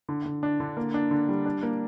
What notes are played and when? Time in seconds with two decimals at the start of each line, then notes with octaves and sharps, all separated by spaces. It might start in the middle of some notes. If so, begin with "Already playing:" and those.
0.09 D3
0.26 D3
0.43 D4
0.60 D3
0.77 A#3
0.94 D4
1.11 D3
1.29 G3
1.46 D4
1.63 A#3